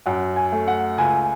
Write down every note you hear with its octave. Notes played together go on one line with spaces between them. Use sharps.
F#2 F#5
G#5
A3
F#5
C#2 G#5